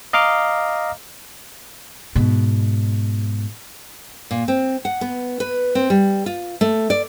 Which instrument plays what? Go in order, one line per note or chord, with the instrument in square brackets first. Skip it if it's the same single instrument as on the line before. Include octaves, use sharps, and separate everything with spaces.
[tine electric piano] D#5 F5 A#5 D6 F6
[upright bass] G#2 B2
[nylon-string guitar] A#2
C4
F#5
B3
B4
C4
G3
F4
A3
D5